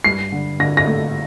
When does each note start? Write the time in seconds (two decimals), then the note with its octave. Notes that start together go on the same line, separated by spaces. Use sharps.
0.04 G2 C7
0.32 D3
0.60 D3 A#6
0.77 A#6
0.87 A3